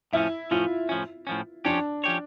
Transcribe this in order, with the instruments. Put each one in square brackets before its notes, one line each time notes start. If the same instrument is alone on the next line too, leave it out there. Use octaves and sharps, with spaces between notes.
[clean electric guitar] A2 F3 C#4 [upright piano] E4
[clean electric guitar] A2 F3 C#4 [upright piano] F4
[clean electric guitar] A2 F3 C#4
A2 F3 C#4
[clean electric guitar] F3 C#4 G4 C#5 [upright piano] D4
[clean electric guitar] F3 C#4 G4 C#5